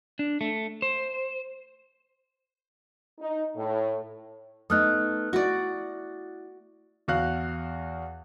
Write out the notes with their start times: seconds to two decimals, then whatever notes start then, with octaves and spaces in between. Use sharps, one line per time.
0.19 D4
0.41 A3
0.82 C5
3.19 D#4
3.56 A2
4.70 A3 B3 D#4 D#6 F6 F#6
5.33 E4 F#4 D5
7.08 E2 F#4 F5 F#6